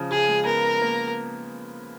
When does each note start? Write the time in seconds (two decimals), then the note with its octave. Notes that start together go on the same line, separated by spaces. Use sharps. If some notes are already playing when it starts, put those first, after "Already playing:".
Already playing: C#3 F3
0.11 C#3 G#4
0.28 G#3
0.46 B3 A#4
0.81 A#3